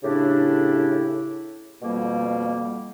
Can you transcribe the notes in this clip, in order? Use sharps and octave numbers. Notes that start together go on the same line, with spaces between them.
A2 C#3 D4 E4 G4
F2 B2 G3 A#3